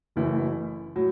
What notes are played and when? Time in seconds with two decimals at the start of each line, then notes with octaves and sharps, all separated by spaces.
0.16 F#1 F#2 E3 A3 E4
0.96 A2 F#3